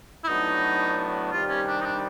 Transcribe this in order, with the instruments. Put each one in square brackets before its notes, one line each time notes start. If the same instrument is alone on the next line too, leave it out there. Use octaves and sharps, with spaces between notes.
[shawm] E4
[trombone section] A2 F#3 B3 D4 [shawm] D#4
[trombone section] C3 D#3 G3 [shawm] F4
[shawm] C#4
D4
D#4
D4